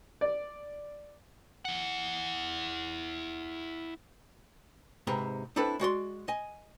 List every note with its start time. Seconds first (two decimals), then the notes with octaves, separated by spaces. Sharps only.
0.21 D5
1.65 E4 F#5
5.07 G#2 C3 B4 A#5
5.56 C4 D4 E4 A4 B4
5.80 G#3 F#4 D5 C6
6.28 D#5 G#5